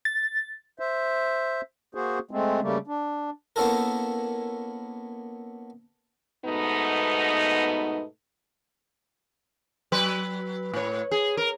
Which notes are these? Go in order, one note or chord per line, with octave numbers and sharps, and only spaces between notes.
A6
C5 E5
A#3 F#4 G#4 C5
G#3 A3 C4
C#3 G3 A3 A#3
D4
A#3 B3 C#4 E4 A4 A#4
G#2 B2 A3 B3 D#4
F#3 B4
A2 C#5
G#4
A#4